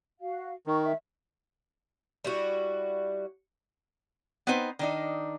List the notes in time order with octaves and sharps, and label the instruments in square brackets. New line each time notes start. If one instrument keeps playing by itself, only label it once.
[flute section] F#4 F5
[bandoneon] D#3 [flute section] A#5 C#6
[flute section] E5
[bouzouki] G3 E4 F#4
[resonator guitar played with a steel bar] B3 C4 D#4 B4 C5
D#3 D4 D#4